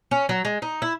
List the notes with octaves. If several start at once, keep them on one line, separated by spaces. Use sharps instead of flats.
C#4
F#3
G#3
D#4
E4